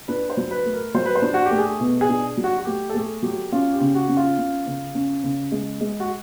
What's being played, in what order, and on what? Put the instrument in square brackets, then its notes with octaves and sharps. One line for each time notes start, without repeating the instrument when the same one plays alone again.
[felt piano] D4 [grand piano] B4
[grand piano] C5
[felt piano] F#3
[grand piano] B4
[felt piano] A3
[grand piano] A#4
[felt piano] F#3 [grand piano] C5
[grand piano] B4
C5
[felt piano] D4
[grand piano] F#4
G4
[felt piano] A3
[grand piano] G#4
[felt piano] B2
[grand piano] G#4
[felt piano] D4
F#3
[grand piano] F#4
F#4
[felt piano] A3 [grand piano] G4
[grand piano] A4
[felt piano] A3 [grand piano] G#4
[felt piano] F#3 [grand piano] G4
[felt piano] C#4 [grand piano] F4
[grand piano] G4
[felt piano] C#3
[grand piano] F#4
[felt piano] C#4
[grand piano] F4
[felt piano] C#4
C#3
C#4
C#3
G#3
G#3
[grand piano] F#4